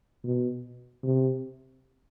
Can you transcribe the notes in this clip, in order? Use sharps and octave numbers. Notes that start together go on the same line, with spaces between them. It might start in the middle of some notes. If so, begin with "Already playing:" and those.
B2
C3